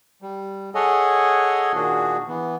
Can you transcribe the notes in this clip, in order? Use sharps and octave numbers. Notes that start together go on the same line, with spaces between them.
G3
G#4 A4 C#5 D#5 F#5 G#5
A#2 D#3 A#3 D4 F#4 G#4
E3 B3